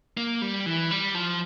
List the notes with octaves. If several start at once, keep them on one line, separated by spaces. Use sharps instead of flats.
A#3
G3
E3
G3
F3